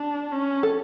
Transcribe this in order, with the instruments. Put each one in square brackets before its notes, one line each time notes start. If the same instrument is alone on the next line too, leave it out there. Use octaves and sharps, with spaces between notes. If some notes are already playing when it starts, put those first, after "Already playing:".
Already playing: [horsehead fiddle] D4
C#4
[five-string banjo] A4